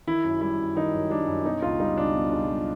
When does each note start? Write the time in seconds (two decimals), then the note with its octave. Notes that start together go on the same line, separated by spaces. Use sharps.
0.07 D#3 E4
0.24 F#2
0.41 G3 E4
0.59 F#2
0.75 D#3 D#4
0.93 F#2
1.10 G3 D4
1.28 F#2
1.45 B2 D#4
1.62 C#2 F4
1.80 G3 D#4
1.97 C#2 D4
2.15 B2
2.31 C#2
2.49 G3